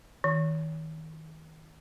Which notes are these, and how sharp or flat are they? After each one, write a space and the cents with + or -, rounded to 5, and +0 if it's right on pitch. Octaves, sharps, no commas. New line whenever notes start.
D#3 +30